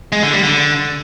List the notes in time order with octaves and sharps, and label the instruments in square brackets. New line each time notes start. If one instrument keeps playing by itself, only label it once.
[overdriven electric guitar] G#3
D3
G3
D3